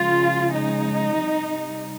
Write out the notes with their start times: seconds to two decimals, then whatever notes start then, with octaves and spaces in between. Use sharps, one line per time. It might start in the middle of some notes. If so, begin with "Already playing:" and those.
Already playing: C#3 F3 G#3 F4
0.53 D#4
1.19 C3 G3